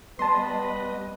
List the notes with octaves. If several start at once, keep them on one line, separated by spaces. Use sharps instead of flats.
G3 B3 B4 D#5 A5 C6